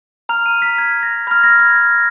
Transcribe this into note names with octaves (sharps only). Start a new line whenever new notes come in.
A#5 F6 F7
D#7
B6
G#6
A#6
B5 F6 G#6
A#6
G#6
A#6